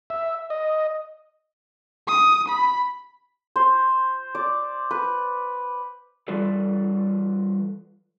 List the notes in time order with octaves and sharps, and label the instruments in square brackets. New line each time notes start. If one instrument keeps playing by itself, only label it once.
[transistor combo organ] E5
D#5
[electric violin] D#6
B5
[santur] C5
D5
B4
[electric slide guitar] E3 G3 F4 A4 B4 D5